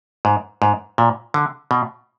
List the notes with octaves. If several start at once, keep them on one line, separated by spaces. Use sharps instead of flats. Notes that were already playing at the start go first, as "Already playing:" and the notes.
G#2
G#2
A#2
D3
B2